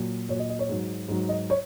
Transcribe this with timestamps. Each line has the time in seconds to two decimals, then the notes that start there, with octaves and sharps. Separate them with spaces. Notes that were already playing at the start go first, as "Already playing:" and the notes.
Already playing: A#2 F#3
0.29 A#2 F#3 C#5
0.39 D#5
0.49 D#5
0.59 C#5
0.69 G#2 F#3
1.08 G#2 F#3
1.29 D#5
1.50 C#5